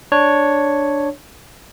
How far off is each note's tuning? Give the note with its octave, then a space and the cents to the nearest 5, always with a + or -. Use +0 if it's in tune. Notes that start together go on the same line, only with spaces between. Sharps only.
D4 +0 C#5 +0